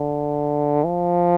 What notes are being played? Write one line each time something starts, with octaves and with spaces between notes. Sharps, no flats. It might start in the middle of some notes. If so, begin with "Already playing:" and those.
Already playing: D3
F3